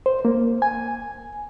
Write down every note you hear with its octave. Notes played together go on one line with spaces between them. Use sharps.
C5
A#3
G#5